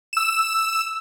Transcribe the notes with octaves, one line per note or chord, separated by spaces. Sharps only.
E6 E7